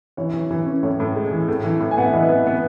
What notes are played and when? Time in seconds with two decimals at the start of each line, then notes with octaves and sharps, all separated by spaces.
0.17 E3 C#5
0.34 E3
0.51 E3
0.66 C#4
0.83 A2 C#5
1.00 A2
1.16 G#3
1.31 E3
1.48 A2
1.64 E3
1.80 A2
1.91 G#5
1.98 B3 F#5
2.06 E5
2.13 E3 B4 D#5
2.29 B3
2.47 B3